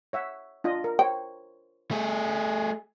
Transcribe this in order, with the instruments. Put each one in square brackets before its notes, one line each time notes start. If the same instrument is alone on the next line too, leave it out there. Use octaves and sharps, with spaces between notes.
[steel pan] C#5 E5 F#5
D4 F4 D#5
A#4
[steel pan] C5 C#5 [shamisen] G5
[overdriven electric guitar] A3 G#4